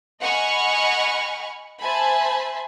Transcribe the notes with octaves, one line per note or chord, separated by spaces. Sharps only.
D#5 F#5 G#5 B5 C#6 F6
C5 E5 G#5 A5 B5